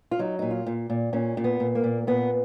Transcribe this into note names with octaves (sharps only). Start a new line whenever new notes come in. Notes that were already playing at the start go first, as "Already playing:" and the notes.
F4
F#3 D#4
A#2 D#4
F4
A#2
A#2
A#2 C#4
A#2
B3
A#2
A#3
A#2
A#2 B3